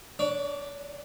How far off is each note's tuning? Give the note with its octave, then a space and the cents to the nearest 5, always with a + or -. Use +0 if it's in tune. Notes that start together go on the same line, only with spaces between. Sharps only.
D4 +0 C#5 +35